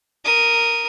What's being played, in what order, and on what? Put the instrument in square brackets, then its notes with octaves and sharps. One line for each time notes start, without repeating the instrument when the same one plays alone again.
[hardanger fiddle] A#4 D#6